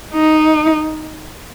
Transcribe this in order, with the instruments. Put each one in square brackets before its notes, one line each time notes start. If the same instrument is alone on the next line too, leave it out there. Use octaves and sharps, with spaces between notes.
[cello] D#4